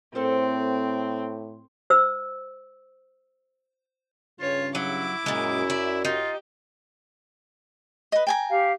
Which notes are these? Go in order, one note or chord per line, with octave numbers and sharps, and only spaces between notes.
A2 C4 A4 A#4 C5
C5 E6
G2 C#3 F4 C#5
F#3 E4 D6
F#2 A#2 G#3
D5 E5
D#4 F4 G4
B4 D#5
G5 G#5 A#5
G4 F5